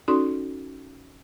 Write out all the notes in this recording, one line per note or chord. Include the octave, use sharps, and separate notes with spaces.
C#4 D#4 F#4 A4 D5 C6